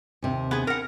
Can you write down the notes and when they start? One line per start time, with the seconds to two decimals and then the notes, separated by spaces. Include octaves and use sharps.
0.22 D#2 C3
0.51 B3 G#4
0.67 A#4 F#5